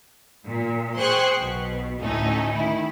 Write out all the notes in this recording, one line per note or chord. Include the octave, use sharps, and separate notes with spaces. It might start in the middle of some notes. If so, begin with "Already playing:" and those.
A#2
G#4 C5 G5 C6 C#6 F#6
B1 B2
D2 A2 A3 C#4 D#4
D#3 E4